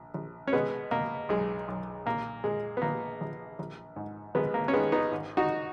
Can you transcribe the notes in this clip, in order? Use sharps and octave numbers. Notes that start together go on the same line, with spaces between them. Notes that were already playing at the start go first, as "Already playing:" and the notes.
Already playing: A#1
A#1
C#4
B2 G#3 B3
B2 A#3
B1 G#3
B1
A#2 A#3
A#2 G#3
B3
A#1 A#3
A#1
A#1
G#2
A#1 G#3 B3
A#3
C#4
D#3 G#3 B3
B3 D#4
G#1
D#4 F#4